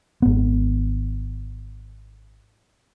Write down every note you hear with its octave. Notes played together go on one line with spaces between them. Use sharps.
G#1 B3